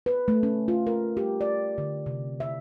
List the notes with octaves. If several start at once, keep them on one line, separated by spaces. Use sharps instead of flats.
B4
A3
C#4
F4
A#4
G4
D5
D3
C3
E5